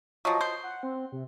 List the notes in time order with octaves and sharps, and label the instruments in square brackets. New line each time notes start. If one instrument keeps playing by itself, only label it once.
[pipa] F3 F#3 [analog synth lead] D#5
[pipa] C5
[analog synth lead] F#5
C4
C3